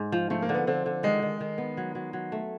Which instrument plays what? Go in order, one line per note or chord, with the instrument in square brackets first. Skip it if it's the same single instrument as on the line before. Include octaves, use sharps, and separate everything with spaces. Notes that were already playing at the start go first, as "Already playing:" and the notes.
Already playing: [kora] G#2
F3
[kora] F3 [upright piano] A3
[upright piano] A#3
[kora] D3
[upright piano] B3
[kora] D3 [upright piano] C4
[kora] D3
[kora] D#3 [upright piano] G#3
[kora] D#3
D#3
B3
F#3
F#3
F#3
A3